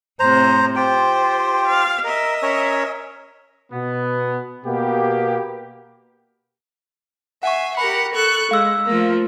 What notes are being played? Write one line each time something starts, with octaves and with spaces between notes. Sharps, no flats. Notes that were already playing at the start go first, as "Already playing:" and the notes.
A2 C3 C5 A#5
F4 G4 C5 G5
F5
A#4 D#5 E5
C#4 A#4 C#5
B2 B3
B2 A#3 B3 G4
E5 F#5 G#5 C#6
G4 A#4 F#5 B5
A4 C#6 F#6
G#3 F5 E6
F3 A3 A#3